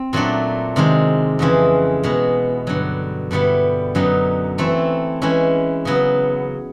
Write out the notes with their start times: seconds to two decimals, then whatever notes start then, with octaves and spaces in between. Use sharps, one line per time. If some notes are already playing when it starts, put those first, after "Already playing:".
Already playing: C4
0.13 A#2 F#3 A3 D4
0.76 C3 D#3 G#3
1.39 F2 C#3 E3 G#3
2.03 B2 G#3 B3
2.67 G2 D3 F#3
3.31 G2 D3 G3 B3 E4
3.95 F#2 D3 F#3 B3 D#4
4.58 E3 A3 C4 E4
5.22 E3 G#3 C#4 E4
5.85 C#3 F#3 B3